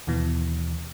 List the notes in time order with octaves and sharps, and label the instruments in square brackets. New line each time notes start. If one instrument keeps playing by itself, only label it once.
[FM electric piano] D#2 B2 E3